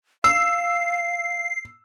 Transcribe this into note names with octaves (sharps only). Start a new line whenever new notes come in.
F5 E6 C7